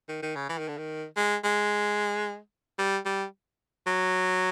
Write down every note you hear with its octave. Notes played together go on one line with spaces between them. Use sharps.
D#3
D#3
C#3
E3
D#3
D3
D#3
G#3
G#3
G3
G3
F#3